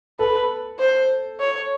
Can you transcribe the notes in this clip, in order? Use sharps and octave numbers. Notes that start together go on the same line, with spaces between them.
A4 B4
C5
C#5